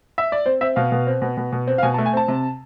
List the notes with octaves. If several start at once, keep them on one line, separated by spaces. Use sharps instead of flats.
E5
D5
C4 C5
C4 E5
B2 F5
B2
C4
B2
B2
B2
C4
F5
B2 G#5
A5
A3
G#5
C4 A5
C3